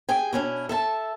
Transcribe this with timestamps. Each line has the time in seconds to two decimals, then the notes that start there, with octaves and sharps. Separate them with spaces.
0.09 G#4 G5 G#5
0.33 B2 C#4 D4 E4
0.69 A4 E5 A5